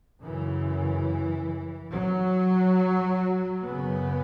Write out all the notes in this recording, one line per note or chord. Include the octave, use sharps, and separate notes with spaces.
F#2 C#3 E3
F#3
F#2 C#3 B3